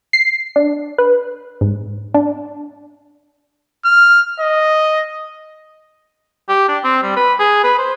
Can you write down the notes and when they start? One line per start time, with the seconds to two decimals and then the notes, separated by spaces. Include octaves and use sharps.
0.13 C7
0.56 D4
0.98 B4
1.61 G#2
2.14 D4
3.85 F6
4.40 D#5
6.49 G4
6.68 D4
6.84 C4
7.03 G3
7.17 B4
7.39 G#4
7.63 B4
7.78 C5